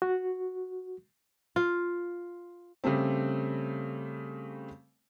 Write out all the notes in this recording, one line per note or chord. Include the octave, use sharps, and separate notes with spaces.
F#4
F4
C#3 G3 A3 C4